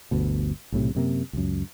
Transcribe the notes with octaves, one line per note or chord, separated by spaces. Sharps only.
G1 D2 B2
B1 A2 C3
F#2 C3 A#3
C#2 F#2